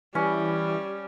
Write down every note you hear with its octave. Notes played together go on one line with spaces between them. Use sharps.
E3 G3 C#4